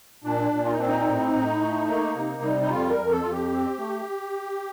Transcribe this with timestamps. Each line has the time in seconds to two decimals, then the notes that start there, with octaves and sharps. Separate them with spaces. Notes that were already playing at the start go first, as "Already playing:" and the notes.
0.24 A#2 D4
0.51 A#2
0.64 F4
0.72 D#4
0.78 C4 D4
0.87 D#4
1.06 A2
1.33 A2
1.60 A3
1.88 A#3
2.15 C3
2.42 G3
2.61 D#4
2.69 F2 F4
2.90 A#4
2.97 F2
3.11 A4
3.22 F2 F4
3.31 G4
3.51 C4
3.79 A3